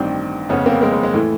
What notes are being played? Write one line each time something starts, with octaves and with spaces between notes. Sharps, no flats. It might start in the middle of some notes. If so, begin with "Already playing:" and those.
Already playing: A1 G2 D#3 C4 D4
F1 F2 C#3 B3 C#4
A#3 C4
G#3 A#3
G#3
G#3
A2 E3 A3